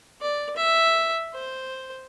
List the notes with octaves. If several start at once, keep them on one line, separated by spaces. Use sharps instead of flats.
D5
E5
C5